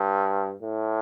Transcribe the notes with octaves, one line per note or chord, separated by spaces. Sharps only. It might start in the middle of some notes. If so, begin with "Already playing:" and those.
Already playing: G2
A2